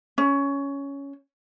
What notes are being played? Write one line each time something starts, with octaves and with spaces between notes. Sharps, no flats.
C#4